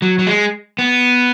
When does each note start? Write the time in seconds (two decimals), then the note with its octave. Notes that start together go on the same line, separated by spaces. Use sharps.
0.02 F#3
0.19 F#3
0.27 G#3
0.79 B3